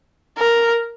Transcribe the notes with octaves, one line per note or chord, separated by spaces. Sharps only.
A#4